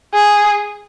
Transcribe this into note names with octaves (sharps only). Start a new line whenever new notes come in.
G#4